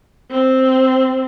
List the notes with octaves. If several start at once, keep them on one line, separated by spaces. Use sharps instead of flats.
C4